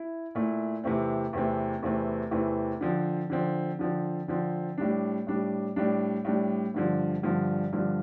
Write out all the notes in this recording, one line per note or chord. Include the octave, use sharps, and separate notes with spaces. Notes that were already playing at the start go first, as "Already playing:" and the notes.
Already playing: E4
A#2 A3 E4
E2 C3 E3 A3 C4
E2 C3 E3 A3 C4
E2 C3 E3 A3 C4
E2 C3 E3 A3 C4
D3 F3 C4
D3 F3 C4
D3 F3 C4
D3 F3 C4
A2 G3 D4
A2 G3 D4
A2 G3 D4
A2 G3 D4
G2 D3 F3
G2 D3 F3
G2 D3 F3